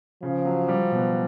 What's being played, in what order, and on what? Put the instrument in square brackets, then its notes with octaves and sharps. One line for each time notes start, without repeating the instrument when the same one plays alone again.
[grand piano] C#3 [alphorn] F3
[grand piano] F#3
G3
B2